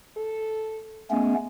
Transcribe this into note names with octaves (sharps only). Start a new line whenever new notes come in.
A4
G#3 A3 B3 C#4